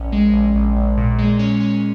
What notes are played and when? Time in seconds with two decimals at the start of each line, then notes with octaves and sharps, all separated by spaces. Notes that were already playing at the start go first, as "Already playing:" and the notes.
Already playing: A#1 C#4
0.12 G#3
0.33 A#1
0.55 A#1
0.76 A#1
0.97 A#2
1.19 G#3
1.39 C#4
1.61 C#4